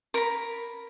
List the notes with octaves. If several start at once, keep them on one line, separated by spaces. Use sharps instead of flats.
A#4 B5